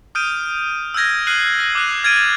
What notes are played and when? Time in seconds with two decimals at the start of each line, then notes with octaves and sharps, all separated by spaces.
0.15 D#6 F6 G6 D7 D#7
0.94 E6 F6 G6 G#6 A#6
1.27 F6 F#6 C7 D#7 F#7
1.60 A#6
1.75 D6 F#6 F7
2.04 F6 G#6 A6 D7 D#7